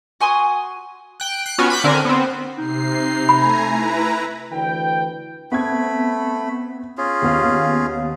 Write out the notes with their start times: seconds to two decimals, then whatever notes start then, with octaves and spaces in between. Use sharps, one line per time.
0.21 F#4 G#5 C6 D#6
1.20 G5 F#6
1.46 F#6 C7 D7
1.58 B3 C#4 F4 F#4 G#5
1.70 B5 D6 F#6 G6
1.84 D3 C4 A#4 G#5
2.05 B3 C4
2.58 C3 D#4 C7
3.29 A3 G#5 A#5 B5
3.67 E4 B4 A#5
4.51 D2 E3 B4 G5
5.52 A3 B3 C4 B5 G#6
6.98 C#4 F4 G#4
7.22 D#2 B3 F5